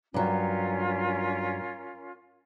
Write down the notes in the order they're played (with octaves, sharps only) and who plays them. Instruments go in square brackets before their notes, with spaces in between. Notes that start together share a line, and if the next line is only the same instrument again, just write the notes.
[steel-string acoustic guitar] G2 F#3 [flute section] C#4 F4 A#4